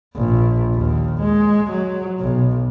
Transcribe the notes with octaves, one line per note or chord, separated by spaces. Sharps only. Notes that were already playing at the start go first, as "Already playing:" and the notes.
A#1
D#2
G#3
F#3
B1